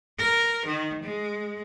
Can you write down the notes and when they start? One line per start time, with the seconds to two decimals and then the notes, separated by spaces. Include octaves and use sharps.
0.18 A#4
0.66 D#3
1.02 G#3